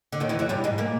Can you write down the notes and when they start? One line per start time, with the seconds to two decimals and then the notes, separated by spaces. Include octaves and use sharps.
0.12 D3
0.20 D#2 D#3
0.29 E2 E3
0.39 F#2 F#3
0.49 G2 G3
0.64 G#2 G#3
0.78 A#2 A#3